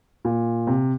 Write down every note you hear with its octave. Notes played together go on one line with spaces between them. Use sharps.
A#2
C3